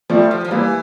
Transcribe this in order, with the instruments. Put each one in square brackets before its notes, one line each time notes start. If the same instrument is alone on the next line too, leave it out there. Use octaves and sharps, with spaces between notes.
[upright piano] F3 A3 [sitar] G3
[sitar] F3
F3
[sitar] E3 [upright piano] G3 A#3